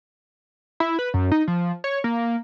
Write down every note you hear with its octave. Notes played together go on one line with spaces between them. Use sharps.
E4
B4
F#2
D#4
F3
C#5
A#3